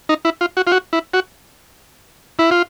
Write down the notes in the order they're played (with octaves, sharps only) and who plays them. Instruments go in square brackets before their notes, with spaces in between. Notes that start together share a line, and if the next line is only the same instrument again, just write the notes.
[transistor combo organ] D#4
E4
F4
F#4
F4
F#4
E4
F#4
E4
F4